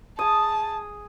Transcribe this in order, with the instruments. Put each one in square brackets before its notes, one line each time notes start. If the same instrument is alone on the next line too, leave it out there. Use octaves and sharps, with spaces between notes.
[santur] G#4 D#6 [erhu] A5